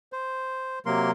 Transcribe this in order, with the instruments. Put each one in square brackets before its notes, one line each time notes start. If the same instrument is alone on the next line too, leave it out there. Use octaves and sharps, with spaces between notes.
[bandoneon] C5
C3 F#3 A#3 A#4 C6